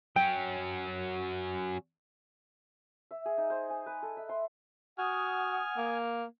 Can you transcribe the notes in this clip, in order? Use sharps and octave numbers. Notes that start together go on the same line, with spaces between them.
F#3 C#4 G5
E5
G#4
D#4
C5
G#5
B4
A4
E5
C6
F#4 F#5 G#5 D#6 F6
A#3